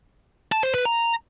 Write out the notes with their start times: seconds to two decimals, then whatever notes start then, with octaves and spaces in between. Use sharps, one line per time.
0.52 A5
0.63 C5
0.74 B4
0.85 A#5